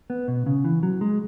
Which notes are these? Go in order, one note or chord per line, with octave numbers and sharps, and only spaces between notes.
B3
B2
C#3
E3
F#3
G#3